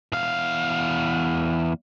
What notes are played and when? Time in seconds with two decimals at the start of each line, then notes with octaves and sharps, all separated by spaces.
0.12 E2 F5